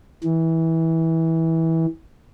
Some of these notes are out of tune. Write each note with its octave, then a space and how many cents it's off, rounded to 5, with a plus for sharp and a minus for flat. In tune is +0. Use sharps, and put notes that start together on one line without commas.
E3 -20